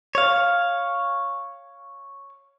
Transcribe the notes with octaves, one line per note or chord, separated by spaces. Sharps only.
C#5 F5